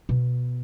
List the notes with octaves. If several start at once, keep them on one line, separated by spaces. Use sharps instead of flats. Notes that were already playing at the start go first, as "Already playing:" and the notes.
B2